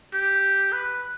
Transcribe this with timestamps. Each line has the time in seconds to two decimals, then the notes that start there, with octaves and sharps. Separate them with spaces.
0.14 G4
0.72 B4